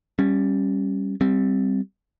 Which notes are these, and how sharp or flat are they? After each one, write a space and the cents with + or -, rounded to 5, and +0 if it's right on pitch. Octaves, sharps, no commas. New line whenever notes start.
G3 +0 C#4 -15
G3 +0 C4 +0